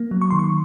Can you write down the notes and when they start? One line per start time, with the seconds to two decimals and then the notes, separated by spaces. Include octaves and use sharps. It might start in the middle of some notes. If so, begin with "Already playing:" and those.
Already playing: A#3
0.11 F#3
0.21 C#6
0.31 D#3 C6
0.39 C#6